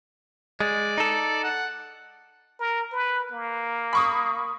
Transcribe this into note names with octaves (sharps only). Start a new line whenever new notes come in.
G#3 D5
D#4 A4
F#5
A#4
B4
A#3
B5 C#6 D#6